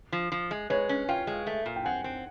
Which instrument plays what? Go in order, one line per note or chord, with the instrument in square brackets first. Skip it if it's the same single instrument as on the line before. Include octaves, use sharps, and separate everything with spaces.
[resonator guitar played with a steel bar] F3
F3
G#3
[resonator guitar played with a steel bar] G#3 [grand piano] B4 C#5
[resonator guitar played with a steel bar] C#4
[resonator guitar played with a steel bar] F4 [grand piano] F5 G5
[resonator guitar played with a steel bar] G#3
A3
A#2
[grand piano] G5
[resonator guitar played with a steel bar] C4 [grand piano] F#5 G#5
[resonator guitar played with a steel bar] C4